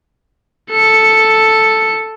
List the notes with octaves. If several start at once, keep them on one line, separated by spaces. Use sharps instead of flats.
A4 C#7